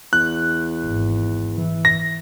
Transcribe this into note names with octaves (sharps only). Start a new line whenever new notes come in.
E2 F#6
G#1
E3
A#6